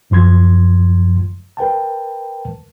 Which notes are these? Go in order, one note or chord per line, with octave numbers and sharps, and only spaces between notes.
G1 F#2 F3 C6 G#6
A#4 B4 G5 A5